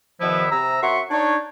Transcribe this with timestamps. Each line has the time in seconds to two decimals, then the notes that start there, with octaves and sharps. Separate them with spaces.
0.21 E2 B2 D#3 F3 B3 E4
0.51 C3 A#5 E6
0.82 F#2 F#4 E5 F#5 C6 C#6
1.11 D4 D#4 C#5